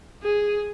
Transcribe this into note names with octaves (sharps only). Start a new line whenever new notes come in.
G#4